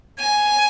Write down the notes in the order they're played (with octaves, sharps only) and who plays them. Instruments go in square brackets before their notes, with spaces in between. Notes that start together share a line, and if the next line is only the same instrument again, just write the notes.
[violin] G#5